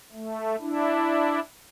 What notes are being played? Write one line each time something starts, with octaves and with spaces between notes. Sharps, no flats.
A3
D4 E4